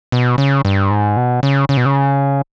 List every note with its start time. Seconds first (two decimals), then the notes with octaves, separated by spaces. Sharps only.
0.12 B2
0.38 C#3
0.65 G2
0.91 G#2
1.17 B2
1.43 C#3
1.69 C#3
1.77 B2
1.85 C#3